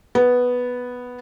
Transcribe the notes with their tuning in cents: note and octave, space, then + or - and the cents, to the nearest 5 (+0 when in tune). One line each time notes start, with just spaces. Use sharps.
B3 +0